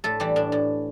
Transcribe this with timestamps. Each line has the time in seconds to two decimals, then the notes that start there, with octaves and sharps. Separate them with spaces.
0.04 A2 A3 A4
0.20 E3 G3 G4
0.36 A2 D4
0.52 A2